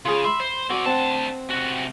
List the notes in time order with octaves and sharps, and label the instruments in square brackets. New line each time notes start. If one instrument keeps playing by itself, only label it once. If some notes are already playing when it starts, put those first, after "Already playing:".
[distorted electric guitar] C#3 [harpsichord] F4 G#4
[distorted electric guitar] E5 [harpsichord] B5 C6
[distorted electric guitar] C5
[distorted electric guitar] C4 D5 [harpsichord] F#4
[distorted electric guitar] D2 A5 [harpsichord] C4 F#5
[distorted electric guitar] C3 F#4